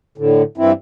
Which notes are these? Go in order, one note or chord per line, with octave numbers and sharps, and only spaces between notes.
A2 D3
G2 E3 C4 E4